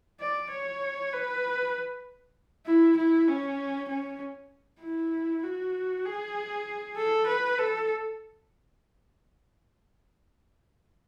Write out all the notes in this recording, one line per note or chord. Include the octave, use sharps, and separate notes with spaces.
D5
C#5
B4
E4
E4
C#4
C#4
E4
F#4
G#4
A4
B4
A4